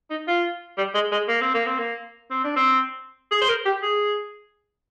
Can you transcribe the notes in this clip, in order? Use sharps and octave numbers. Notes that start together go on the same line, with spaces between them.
D#4
F4
G3
G#3
G#3
A#3
C4
A#3
C4
A#3
C4
D4
C4
G#4
C5
A#4
G4
G#4